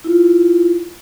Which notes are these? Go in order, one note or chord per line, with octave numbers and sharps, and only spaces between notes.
E4 F4